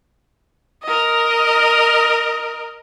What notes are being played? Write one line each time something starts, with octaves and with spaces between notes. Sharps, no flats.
A#4 D#5